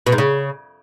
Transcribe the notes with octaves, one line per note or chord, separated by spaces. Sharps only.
B2
G#2
C#3